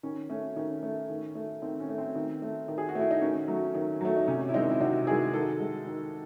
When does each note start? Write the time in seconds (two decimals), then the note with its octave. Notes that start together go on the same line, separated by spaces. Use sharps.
0.03 D#3 C#4
0.30 A3 C#4
0.56 D#3 C#4
0.83 A3
1.09 D#3
1.35 A3
1.62 D#3 C4
1.80 C#4
1.89 A3
1.98 C4
2.15 D#3
2.42 A3
2.68 D#3
2.78 G#4
2.89 F#4
2.95 A3 E4
3.11 D#4
3.21 D#3 C#4
3.48 F#3 A3
3.74 D#3
4.01 F#3 A3
4.17 D#4
4.28 C3 C#4
4.49 E4
4.54 D#3 G#3 C4 D#4
4.70 E4
4.80 C3 D#4 F#4
5.07 D#3 G#3 E4 G#4
5.33 D#3 F#4 A4
5.60 G#3
5.87 D#3